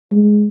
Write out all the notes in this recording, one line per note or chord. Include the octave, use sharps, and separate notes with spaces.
G#3